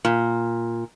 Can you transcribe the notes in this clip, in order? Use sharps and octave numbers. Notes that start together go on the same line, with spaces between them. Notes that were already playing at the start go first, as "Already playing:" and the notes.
A#2